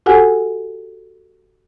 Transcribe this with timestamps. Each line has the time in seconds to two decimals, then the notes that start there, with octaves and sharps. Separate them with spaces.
0.06 F#4 G4 A4 F#5 G#5